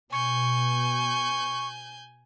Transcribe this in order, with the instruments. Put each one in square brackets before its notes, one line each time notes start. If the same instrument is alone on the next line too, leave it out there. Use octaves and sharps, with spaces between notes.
[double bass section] B2 [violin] G#5 G6 [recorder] C#6